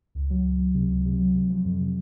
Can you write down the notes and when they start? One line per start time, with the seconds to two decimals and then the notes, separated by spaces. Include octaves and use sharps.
0.15 C#2
0.30 F#3
0.45 C#2
0.59 F#3
0.74 C3
0.90 C#2
1.05 C3
1.19 F#3
1.35 C3
1.50 F3
1.65 F2
1.80 C3